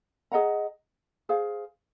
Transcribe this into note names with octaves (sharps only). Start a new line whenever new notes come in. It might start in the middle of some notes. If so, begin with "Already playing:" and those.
G#4 D#5 F#5 A#5
G#4 C5 F5